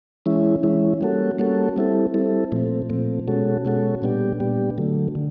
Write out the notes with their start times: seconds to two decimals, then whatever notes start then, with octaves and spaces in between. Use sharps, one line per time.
0.26 E3 G#3 C#4 E4
0.63 E3 G#3 C#4 E4
1.01 G3 A#3 C#4 F#4 A4
1.39 G3 A#3 C#4 F#4 A4
1.76 G3 C4 E4 A4
2.14 G3 C4 E4 A4
2.52 A#2 F3 A3 C4
2.90 A#2 F3 A3 C4
3.28 B2 G#3 C#4 F#4 A4
3.65 B2 G#3 C#4 F#4 A4
4.02 A#2 G3 B3 D4 G4
4.40 A#2 G3 B3 D4 G4
4.78 D3 F#3 A3
5.15 D3